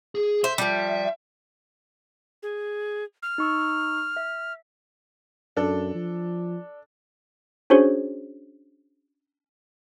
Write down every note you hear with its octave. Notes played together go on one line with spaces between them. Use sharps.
G#4
C5 E5
F3 G3
G#4
F6
D#4 C#6 E6
E5
F#2 D4 A4
F3
C#4 D4 F#4 G#4 C5 C#5